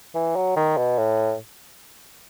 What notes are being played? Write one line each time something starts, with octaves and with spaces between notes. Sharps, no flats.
E3
F#3
D#3
B2
A2